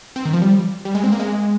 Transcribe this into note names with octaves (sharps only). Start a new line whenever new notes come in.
C4
D#3
F3
G3
G3
G#3
C4
A#3
G#3